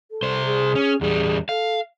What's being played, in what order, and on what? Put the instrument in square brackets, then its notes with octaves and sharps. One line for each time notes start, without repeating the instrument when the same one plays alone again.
[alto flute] A4
[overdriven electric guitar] C2 C5
[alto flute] G#4
[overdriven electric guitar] C#4
[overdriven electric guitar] E2 G3 [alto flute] G#4
[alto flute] A4 [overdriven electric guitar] F5